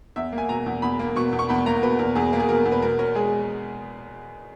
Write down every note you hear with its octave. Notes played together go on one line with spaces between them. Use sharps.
E2 E5
A#3
G#5
B2 A#5
E2
E2 B5
A#3
B2 C#6
E2
C#6
E2 B5
A#3 A#5
B2 B4
E2 A#4
E2 G#4
A#3
G#4
B2 A#4
E2
B4
B2 A#4
C#4 A#4
G#3 G#4